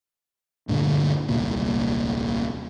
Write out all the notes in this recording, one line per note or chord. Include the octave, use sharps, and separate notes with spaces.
D2 G2 A#2 D3
D#1 C2 A#2